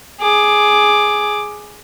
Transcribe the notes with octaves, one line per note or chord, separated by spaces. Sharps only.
G#4 D6